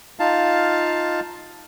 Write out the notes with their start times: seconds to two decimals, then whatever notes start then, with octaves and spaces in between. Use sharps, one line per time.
0.20 D#4 F4 F5 A5